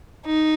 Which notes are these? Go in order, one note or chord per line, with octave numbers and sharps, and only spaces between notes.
D#4